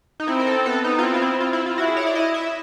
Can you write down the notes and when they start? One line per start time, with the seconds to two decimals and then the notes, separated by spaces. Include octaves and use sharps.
0.20 D#4
0.28 C4 E4
0.40 A#4
0.47 A4
0.66 B3 A4
0.84 D#4
0.99 F4
1.03 C4 E4
1.14 F4
1.22 E4
1.40 F4
1.53 E4
1.66 F4
1.77 E4 F#4
1.87 G#4
1.97 C#5
2.06 D5
2.15 E4 D#5
2.34 E5